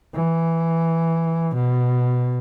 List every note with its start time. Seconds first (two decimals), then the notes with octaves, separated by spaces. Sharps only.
0.15 E3
1.55 B2